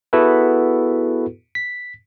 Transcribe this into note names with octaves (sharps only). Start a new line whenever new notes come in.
B3 E4 F#4 G#4 A4 B4
B6